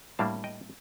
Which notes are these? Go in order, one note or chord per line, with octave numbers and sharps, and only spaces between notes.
A2 G3 A#3 D4 F5 A5
D#5 G5